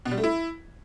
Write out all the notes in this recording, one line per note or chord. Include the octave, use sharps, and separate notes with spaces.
B2
G3
A3
E4